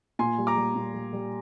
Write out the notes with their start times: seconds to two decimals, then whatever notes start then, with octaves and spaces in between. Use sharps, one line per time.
0.19 A#2 G#5 C6
0.38 G3
0.47 A#5 D6
0.56 G3
0.76 A#2
0.94 G3
1.13 G3